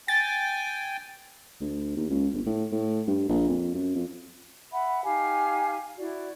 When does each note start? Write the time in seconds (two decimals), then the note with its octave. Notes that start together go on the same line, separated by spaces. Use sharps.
0.08 G5 G#5 A6
1.61 D2
1.97 D#2
2.10 C#2
2.33 G1
2.46 A2
2.72 A2
3.07 G2
3.29 A#1
3.49 F2
3.74 F#2
3.95 F2
4.71 E5 F#5 B5
5.04 D#4 G4 F5 G#5
5.98 E4 F#4 D5